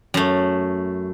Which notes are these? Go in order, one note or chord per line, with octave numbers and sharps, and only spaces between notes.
F#2 A3